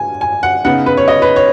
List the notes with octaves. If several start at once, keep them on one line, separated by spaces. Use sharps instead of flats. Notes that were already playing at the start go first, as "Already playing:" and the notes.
Already playing: G#5
G#5
F#5
C#3 B3 D#4 F#5
B4
C#5
D#5
B4
C#5